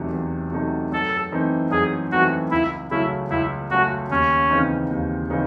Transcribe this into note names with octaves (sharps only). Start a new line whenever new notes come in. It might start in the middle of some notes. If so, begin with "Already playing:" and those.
Already playing: E2 C3 F#3 A3 D#4
E2
C3 F#3 A3 D#4
F#2 A4
E3 A3 C4 D#4
F#2 G#4
E3 A3 C4 D#4 F#4
C#2 E4
C#3 F#3 A3 C#4 E4
C#2 E4
C#3 F#3 A3 C#4 F#4
D#2 C#4
C#3 E3 C4 D#4
D#2
C#3 E3 C4 D#4